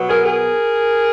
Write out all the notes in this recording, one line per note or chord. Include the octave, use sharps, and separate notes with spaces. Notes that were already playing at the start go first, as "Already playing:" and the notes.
Already playing: B2 F#3 B3
G#4 A#4
G#4 A#4